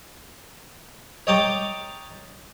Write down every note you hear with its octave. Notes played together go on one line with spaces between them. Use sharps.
C#5 D#5 G5 A5 A#5 D6